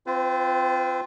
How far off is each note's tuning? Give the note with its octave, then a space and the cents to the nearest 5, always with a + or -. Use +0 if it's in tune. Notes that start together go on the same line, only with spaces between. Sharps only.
C4 +0 F4 +0 C5 -45